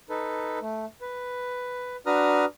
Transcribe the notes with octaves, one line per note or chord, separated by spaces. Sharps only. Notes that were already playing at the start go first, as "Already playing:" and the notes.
D#4 A4 B4
A3
B4
D4 F#4 B4 A#5 D#6 F6